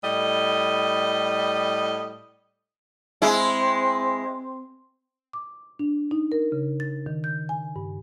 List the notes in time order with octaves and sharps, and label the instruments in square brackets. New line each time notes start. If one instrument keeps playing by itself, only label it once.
[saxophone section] A2 G3 D#5
[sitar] G#3 E4 [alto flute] C4
[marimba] D6
D4
D#4
A#4
C#3
A6
D#3
G6
G#5
G2